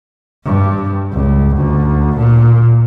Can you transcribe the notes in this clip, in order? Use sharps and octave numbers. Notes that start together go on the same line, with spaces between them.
G2
C#2
D2
A#2